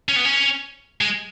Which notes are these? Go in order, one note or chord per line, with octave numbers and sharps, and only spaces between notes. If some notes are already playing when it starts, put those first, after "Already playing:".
C#4
B3
C#4
G#3